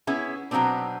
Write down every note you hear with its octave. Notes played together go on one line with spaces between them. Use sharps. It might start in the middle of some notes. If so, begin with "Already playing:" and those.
B3 C#4 E4 G#4
B2 F#3 A3 B3 C4 D4